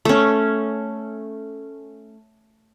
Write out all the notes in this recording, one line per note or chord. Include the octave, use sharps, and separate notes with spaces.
A3 C#4